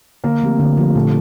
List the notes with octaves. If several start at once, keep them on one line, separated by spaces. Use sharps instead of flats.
D3 A#3
F3 A3 C4 G4
D3
F3 A3 C4 G4
A#2 A3